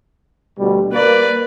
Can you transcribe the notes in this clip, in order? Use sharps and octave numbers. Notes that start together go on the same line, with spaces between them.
D2 B2 G3
A#3 B4 D5